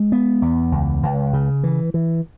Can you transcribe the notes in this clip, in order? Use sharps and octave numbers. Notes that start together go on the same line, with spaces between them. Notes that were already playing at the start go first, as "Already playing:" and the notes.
Already playing: G#3
B3
E2
C#2
C#2
C#3
E3
E3